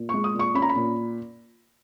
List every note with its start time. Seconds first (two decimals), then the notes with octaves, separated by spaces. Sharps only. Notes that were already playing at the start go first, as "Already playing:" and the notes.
Already playing: A#2
0.09 G#3 C#6
0.24 D#6
0.34 A#2
0.39 C#6
0.54 C#4 B5
0.62 A#5
0.69 B5
0.76 A#2